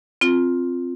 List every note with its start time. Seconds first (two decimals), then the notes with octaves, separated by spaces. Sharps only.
0.21 C4 F4